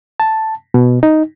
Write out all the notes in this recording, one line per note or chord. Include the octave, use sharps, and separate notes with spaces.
A5
B2
D#4